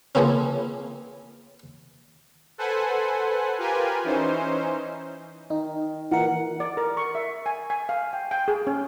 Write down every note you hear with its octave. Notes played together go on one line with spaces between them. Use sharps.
C#3 E3 F3 A#3 C4 C#4
A4 B4 C5 F#5 G#5
F4 G4 A#4 B4 G#5
E3 C#4 D#4 C5
D#3 D#4
A#2 E3 A#4 F#5
D5
A#4
C#6
E5
G#5
G#5
F5
G5
G5
G#4
C#4